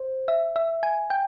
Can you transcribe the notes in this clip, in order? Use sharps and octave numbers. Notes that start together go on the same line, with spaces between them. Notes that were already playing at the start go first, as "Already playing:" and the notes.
Already playing: C5
E5
E5
G#5
G5